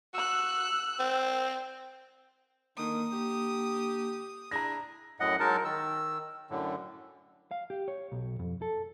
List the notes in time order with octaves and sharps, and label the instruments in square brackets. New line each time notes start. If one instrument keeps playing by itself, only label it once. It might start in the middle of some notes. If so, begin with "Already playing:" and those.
[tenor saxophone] F#4 [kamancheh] E6 F#6
[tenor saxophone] C4
[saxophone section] D3 D#3 [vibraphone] A#3 [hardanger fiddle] D#6
[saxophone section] D3 G4
[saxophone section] D4 E4 G#4 [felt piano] A#5 A#6
[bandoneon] F#2 A2 D#5 F#5
F#3 G#3 D#4 A#4 A5
D#3 E6
F#2 A2 D3
[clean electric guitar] F5
G4
C#5
B1
F2
A4